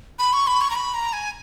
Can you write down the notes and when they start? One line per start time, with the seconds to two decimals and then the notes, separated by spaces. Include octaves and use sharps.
0.19 B5
0.33 C#6
0.47 B5
0.61 C#6
0.70 A#5
0.75 B5
0.94 A#5
1.13 G#5